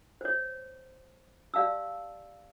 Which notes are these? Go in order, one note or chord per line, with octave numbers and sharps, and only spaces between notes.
C5 C#5
G4 D5 F5 A5 E6